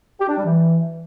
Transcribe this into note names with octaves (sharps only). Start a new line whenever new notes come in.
G4
D4
G3
E3